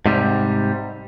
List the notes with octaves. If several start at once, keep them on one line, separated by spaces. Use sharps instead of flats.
G#2 C3 G3